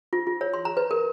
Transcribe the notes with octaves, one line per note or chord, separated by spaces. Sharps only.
F4
F4
C#5
C6
A#5
B4
A#4